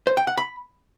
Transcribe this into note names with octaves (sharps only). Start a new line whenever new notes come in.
C5
G5
F#5
B5